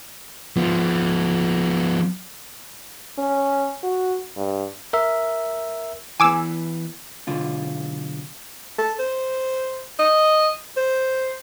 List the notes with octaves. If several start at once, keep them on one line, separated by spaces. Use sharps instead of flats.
F3 B3
C#4
F#4
G2
A#4 E5
E3 B3 G#5 D6 E6
B1 D3 F4
A4
C5
D#5
C5